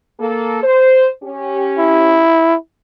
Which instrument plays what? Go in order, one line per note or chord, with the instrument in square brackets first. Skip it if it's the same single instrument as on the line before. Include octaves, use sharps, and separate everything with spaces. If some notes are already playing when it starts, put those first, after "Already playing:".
[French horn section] A#3 A4
C5
C#4 G4
[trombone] E4